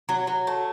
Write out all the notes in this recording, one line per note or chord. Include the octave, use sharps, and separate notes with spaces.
F#3
F#3
A3